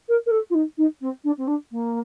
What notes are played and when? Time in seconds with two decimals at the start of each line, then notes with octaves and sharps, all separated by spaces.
0.09 A#4
0.26 A#4
0.31 A4
0.50 F4
0.54 D#4
0.78 D#4
1.01 C4
1.24 D4
1.38 C4
1.47 D4
1.71 A#3